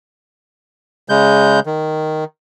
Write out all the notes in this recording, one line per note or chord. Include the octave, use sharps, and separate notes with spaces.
C#3 G#3 G6
D#3